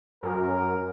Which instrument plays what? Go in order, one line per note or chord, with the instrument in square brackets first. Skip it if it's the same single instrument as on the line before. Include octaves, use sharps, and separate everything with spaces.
[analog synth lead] F#2 [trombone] A#4